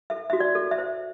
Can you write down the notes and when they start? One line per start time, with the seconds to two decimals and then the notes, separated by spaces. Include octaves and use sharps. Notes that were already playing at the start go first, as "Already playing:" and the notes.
0.10 A4 E5
0.30 F#4 E5
0.40 D5
0.55 A4
0.71 E5
0.78 C5